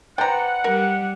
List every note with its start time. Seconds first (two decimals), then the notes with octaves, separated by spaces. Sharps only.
0.18 B4 C5 D5 F#5 G5 A#5
0.64 G3 A#4